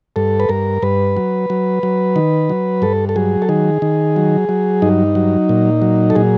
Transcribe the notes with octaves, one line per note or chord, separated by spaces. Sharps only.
G2 A4
B4
G2 A#4
G2 B4
F#3
F#3
F#3
D#3
F#3
G2 A4
A4
F#3 G#4
A4
D#3 G#4
D#3
F#3
F#3
G2 D#4
F#3
A#2
F#3
A4
A#2 G#4